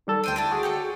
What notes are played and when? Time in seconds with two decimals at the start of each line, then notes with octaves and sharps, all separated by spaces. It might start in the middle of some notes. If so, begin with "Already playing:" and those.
0.07 D#3 G3 A4
0.24 D2 D4 C5 G5 D#7
0.36 D4 E4 A5
0.51 F#4 G#4
0.63 G4 A4 C#5